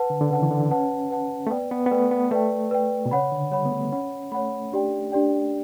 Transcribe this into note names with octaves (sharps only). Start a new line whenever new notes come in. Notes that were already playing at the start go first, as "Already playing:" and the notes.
Already playing: B4 F#5 A5
D3
D3
C#3 B4 F#5 A5
E3
D3
C#4 B4 F#5 A5
B4 F#5 A5
A3
B3 B4 D5 G5
B3
B3
A3 B4 D5 G5
B3
A3 B4 D5 G5
B4 D5 G5
B2
C#3 C#5 F#5 B5
D3
G3 C#5 F#5 B5
B3
A3
C#4 C#5 F#5 B5
A3 C#5 F#5 B5
D4 G4 D5 G5
D4 G4 D5 G5